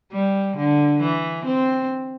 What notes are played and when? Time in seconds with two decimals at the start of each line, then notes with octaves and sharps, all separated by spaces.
0.12 G3
0.57 D3
1.02 E3
1.46 C4